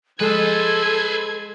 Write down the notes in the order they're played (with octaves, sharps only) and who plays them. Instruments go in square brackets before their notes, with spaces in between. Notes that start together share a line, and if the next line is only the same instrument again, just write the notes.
[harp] G#3 [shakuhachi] A4 [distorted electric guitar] B4 C5 [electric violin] G#6